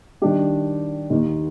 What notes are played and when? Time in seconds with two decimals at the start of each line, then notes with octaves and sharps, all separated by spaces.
0.22 D#3 G3 D4 G4
1.10 D#2 D#3 A#3